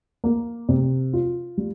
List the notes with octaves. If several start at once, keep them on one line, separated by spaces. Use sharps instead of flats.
A#3
C3
F4
G3